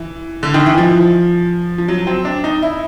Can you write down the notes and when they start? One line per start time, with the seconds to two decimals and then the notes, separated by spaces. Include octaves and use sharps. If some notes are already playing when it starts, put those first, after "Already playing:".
Already playing: E3
0.43 D3
0.54 D#3
0.66 E3
0.78 F3
1.78 F3
1.88 F#3
2.07 C4
2.25 D4
2.44 D#4
2.62 E4